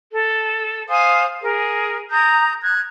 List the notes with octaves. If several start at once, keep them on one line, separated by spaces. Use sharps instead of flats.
A4
C5 F5 G#5 D#6
G#4 A#4
A#5 D#6 G6
F#6 G#6